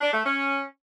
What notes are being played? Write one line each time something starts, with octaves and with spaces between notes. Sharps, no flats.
D4
A3
C#4